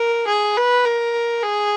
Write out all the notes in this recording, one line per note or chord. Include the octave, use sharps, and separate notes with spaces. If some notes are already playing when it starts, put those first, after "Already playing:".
Already playing: A#4
G#4
B4
A#4
G#4